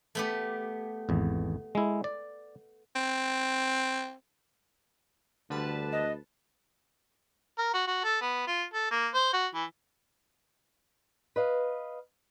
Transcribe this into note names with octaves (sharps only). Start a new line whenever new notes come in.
A3 B3 G4
G#1 E2
G#3 E4
D5
C4
D2 D3 G3 B4 A5
D#5
A#4
F#4
F#4
A4
B3
F4
A4
A#3
C5
F#4
E3
B4 D#5 F5